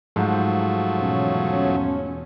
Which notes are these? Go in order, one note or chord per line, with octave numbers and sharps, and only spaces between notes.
G#2 F3 F#3 A3
E2 B2 C#4